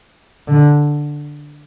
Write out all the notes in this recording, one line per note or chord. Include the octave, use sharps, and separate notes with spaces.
D3